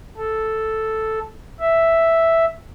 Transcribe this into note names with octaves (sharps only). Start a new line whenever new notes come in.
A4
E5